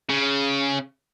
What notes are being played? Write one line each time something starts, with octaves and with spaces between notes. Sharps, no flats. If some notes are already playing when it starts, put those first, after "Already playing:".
C#3